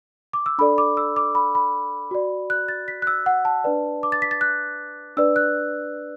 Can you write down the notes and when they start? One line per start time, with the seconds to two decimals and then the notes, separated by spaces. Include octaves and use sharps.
0.33 D6
0.46 E6
0.58 D4 A4 D5 B5
0.78 D6
0.97 E6
1.16 D6
1.35 B5
1.55 B5
2.11 F#4 D5
2.50 F#6
2.68 A6
2.88 B6
3.02 F#6
3.07 E6
3.26 F#5
3.45 A5
3.64 D4 B4 D5
4.03 D6
4.12 A6
4.22 B6
4.31 A6
4.41 F#6
5.17 D4 B4 D5 E6
5.36 F#6